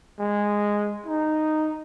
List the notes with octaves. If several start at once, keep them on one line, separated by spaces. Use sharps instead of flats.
G#3
D#4